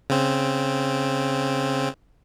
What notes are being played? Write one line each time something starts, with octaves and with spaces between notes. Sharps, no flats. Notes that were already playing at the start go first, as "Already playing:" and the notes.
C#3 C4